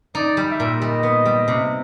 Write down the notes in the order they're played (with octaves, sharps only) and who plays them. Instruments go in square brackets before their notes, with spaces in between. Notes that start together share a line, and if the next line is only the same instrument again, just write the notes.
[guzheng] D#4 [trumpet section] D5
[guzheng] G3
[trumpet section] E5
[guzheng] A#2
[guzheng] G3 [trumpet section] D#5
[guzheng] B3
G3
C3